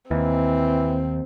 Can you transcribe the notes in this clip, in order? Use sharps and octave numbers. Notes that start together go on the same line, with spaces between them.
D#2 E3 C4